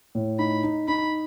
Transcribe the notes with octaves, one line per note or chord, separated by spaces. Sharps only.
A2
D#4 B5
D#4
D#4 B5